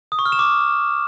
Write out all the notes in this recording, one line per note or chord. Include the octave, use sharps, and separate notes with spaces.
D#6
C#6
F6
E7
D6